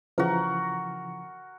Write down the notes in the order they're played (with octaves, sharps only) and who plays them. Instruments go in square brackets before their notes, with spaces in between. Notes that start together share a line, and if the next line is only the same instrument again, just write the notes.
[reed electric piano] C#3 E3 F3 [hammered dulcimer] F#4 A#4